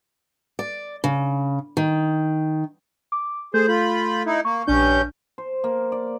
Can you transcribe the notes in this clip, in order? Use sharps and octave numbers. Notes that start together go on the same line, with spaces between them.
D5
C#3
D#3
D6
A3 G#4 A4 C5 G6
F4 B5
D#4 E4
A#3 C#6
A#1 G2 C#4 D4 G6
C5
A#3
D5